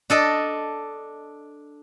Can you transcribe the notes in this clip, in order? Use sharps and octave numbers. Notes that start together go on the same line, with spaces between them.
D4 A4 D#5